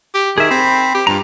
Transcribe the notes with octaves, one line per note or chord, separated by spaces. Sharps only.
G4
D#3 G#4 E5
C4 B5
G4
G2 F4 A#5